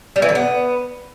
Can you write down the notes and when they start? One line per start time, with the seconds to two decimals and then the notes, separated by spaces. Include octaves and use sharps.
0.16 G3
0.22 E3
0.29 D3
0.35 B3